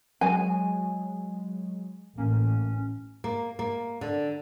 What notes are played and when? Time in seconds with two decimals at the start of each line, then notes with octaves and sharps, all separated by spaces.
0.21 F#3 G#3 G#5
2.18 A1 A#3 C#4
3.24 A#3
3.59 A#3
4.01 D3